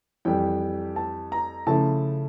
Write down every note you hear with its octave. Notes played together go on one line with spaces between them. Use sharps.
F2 E3 G3 G5
A5
A#5
C#3 F3 A3 E4 A5